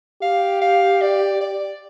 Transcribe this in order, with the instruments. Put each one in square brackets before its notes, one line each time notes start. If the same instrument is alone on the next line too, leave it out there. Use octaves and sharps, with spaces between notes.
[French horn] G4 [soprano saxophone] F5
[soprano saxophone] F5
D5
D5